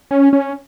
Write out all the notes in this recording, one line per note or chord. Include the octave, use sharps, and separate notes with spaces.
C#4
C#4